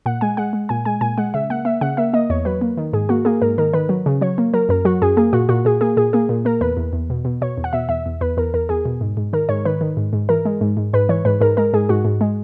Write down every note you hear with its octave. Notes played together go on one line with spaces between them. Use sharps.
A#2 F#5
G#3 G#5
G#3 F#5
G#3
A#2 G#5
G#3 G#5
A#2 G#5
G#3 F#5
C#3 E5
A#3 F#5
A#3 E5
C#3 F#5
A#3 E5
A#3 D#5
E2 C#5
F#3 B4
A#3
D#3
G#2 G#4
A#3 F#4
A#3 G#4
G#2 A#4
D#3 A#4
D#3 B4
F#3
C#3
F#3 C#5
A#3
F#3 A#4
F#2 A#4
F#3 F#4
F#2 G#4
A#3 G#4
A#2 F#4
A#2 F#4
A#2 G#4
A#3 G#4
A#2 G#4
A#3 G#4
A#2
A#3 A#4
E2 B4
E2
E2
B2
B2
B2 C#5
E2
F#5
B2 E5
E2 E5
E2
E2 B4
E2 A#4
E2 A#4
E2 G#4
B2
G#2
G#2
D#3 A#4
G#2 C#5
D#3 B4
D#3
G#2
G#2
E3 A#4
G#3
G#2
G#2
G#2 B4
E3 C#5
G#2 B4
G#2 A#4
G#3 A#4
G#2 G#4
G#2 F#4
G#2
G#3